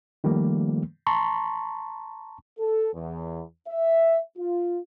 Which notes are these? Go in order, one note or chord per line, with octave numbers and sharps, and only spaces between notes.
D#3 F3 G3 A3 A#3
A5 A#5 C6 C#6
A4
E2
E5
F4